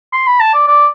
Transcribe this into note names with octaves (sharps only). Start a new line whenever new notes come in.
C6
B5
A5
D5
D5